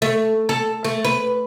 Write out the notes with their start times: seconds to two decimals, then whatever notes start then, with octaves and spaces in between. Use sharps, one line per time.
0.02 A3
0.49 A4
0.85 A3
1.05 B4